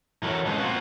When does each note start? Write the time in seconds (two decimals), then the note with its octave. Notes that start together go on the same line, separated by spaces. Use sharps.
0.23 E3 F#4 A4 A#4 C#5
0.46 G#3 C#4 G#4 A4 B4 C5
0.58 A#3 C4 F4 F#4